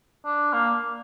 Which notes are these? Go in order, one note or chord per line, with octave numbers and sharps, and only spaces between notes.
D4
A#3